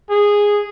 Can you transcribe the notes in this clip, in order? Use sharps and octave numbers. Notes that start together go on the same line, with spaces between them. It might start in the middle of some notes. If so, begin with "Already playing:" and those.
G#4